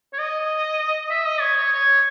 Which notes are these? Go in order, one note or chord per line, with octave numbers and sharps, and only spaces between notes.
C#5
D#5
E5
D#5
C#5
C#5
C#5